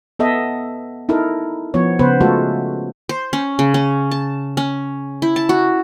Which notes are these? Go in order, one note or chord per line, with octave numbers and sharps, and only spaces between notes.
B3 A4 D#5 E5
D#4 E4 A4 A#4
F3 B3 C#5
C#3 B3 B4 C5
G#3 A3 F4 F#4 A4
C5
C#4
C#3
C#4
A5
C#4
E4
A5
F#4